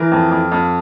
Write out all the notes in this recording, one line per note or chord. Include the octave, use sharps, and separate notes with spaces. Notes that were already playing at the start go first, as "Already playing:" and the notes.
Already playing: E3 A#4
F2
F2
F2